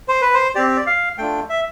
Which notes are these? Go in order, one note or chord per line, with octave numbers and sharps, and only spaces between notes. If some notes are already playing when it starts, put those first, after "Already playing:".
C5
B4
C5
C4 G4 D5
D5
F5
A3 D4 F4 G5
E5